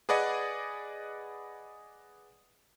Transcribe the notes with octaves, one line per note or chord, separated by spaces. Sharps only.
G#4 B4 D5 D#5 F#5 G#5